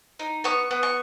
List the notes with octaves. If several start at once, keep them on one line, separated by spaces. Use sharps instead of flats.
D#4
B3 C#6
B3
C#6